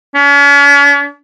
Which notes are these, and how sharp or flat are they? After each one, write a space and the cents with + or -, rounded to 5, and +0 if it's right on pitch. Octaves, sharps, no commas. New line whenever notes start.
C#4 +45